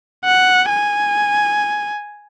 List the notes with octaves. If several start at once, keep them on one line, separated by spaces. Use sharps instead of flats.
F#5
G#5